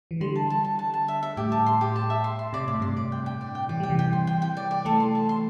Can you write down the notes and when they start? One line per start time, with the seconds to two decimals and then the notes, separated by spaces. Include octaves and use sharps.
0.11 E3
0.20 D3 G3 C6
0.36 A5
0.50 A5
0.65 A5
0.79 A5
0.94 A5
1.08 E5
1.23 E5
1.37 A2 G4
1.52 A5
1.66 C6
1.81 G4
1.96 A5
2.10 E5
2.24 C6
2.39 C6
2.53 C3 D5
2.67 A2 D5
2.79 G2 C3 C6
2.97 D5
3.12 G5
3.26 G5
3.41 D5
3.55 G5
3.69 E3 D5
3.80 G3 G5
3.90 C3 E3
3.99 G5
4.13 C6
4.27 G5
4.42 G5
4.57 D5
4.71 D5
4.85 E3 A3 A4
5.00 C6
5.15 A5
5.29 C6